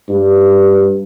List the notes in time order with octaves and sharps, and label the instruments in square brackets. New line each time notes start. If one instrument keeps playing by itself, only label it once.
[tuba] G2